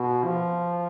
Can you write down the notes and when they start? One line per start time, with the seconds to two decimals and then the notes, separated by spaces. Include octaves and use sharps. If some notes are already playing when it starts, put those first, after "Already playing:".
Already playing: B2
0.24 F3